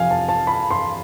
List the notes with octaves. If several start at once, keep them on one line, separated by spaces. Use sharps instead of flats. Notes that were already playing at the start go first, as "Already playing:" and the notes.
Already playing: F2 C3 F3 F5 G#5
A5
A5
B5
C6